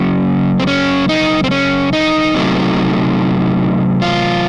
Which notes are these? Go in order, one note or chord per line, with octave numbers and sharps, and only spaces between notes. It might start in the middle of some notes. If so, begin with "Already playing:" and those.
Already playing: C#3 F#3 A#3 C#4
C4
C#4
D#4
C4
C#4
D#4
C3 F#3 A3
F4